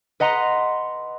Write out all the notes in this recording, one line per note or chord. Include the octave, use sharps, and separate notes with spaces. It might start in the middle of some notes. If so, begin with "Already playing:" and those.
B4 D#5 F#5 A#5 C6